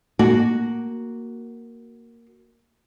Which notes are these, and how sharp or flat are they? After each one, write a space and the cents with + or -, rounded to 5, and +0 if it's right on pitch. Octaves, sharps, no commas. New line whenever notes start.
A#3 +0 F#4 +0